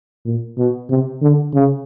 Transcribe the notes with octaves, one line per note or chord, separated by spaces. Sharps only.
A#2
B2
C3
D3
C#3